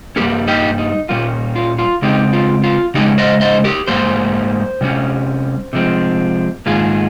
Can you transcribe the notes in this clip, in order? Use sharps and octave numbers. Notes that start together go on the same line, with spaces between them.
G2 G3 A#3 C#4 G4 A#4
D#4 G4
D#4
A#2 G3 A#3 C#4 F4
F4
F4
C#3 G#3 C4 D#4 G4
F4
F4
C#3 G#3 C#4 D#4 G4
C5 D#5
C5 D#5
G4 A#4
G#2 G3 A#3 C5
C3 G3 C#4
C3 F3 G#3 C4
G#2 D#3 A#3 F4 G#4